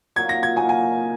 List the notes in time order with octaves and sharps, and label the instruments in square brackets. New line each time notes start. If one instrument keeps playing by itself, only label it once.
[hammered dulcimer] A#2 F#3 D#4 F#4 [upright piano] G#6
[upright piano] A#6
G#6
[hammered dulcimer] A#2 F#3 D#4 F#4 [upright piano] G#5
[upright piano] G#5